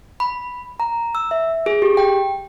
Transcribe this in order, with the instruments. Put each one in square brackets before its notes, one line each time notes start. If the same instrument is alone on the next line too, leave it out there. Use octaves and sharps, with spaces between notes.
[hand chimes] B5
A#5
E6
E5
G#4
G4
G5